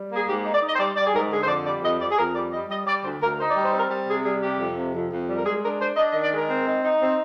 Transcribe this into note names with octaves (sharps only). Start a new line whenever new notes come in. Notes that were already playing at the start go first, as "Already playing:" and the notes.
Already playing: G3
A#3
G#4
G#2 G4
D#4
D5
D#4
D#5
C5
G3 D5
G3 D5
G#4
G#2 A#4
D3 G#4
C5
F2 D5
G3 D5
F2 D#5
F2 D5
G#4
F2 A#4
G3 D5
G3 D#5
G3 D#5
G3 D5
D2 C5
D2 A#4
D#4 C5
D5
G3
C5
C4 A#4
G3
C3 G#4
G3 G#4
C3 G4
F2
C3
F2
F2
G3
A#4
G#3 G#4
D4 A#4
D4 C5
D4 D#5
D#5
D#3
D5
G#3 A#4
C4
D#4
D#4
C4